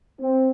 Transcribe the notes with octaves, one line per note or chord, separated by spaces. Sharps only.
C4